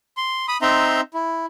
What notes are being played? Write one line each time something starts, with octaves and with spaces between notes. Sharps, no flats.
C6
B5 D#6
C4 D#4 E5 A#5 C6
E4